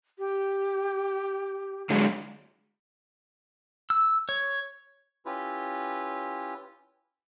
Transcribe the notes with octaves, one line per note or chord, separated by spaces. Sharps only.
G4
D3 F#3 G#3
E6
C#5
C#4 E4 F4 G4 B4